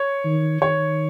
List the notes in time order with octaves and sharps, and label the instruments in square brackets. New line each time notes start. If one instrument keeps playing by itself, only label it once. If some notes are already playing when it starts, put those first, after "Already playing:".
Already playing: [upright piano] C#5
[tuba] D#3
[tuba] D#3 [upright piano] C#5